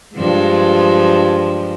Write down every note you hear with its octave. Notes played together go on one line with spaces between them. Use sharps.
G2 F3 G#3